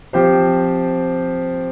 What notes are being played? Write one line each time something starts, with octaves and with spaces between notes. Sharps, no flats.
F3 C4 G4 C5